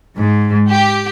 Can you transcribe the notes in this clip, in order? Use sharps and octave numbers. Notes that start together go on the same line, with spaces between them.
G#2
G4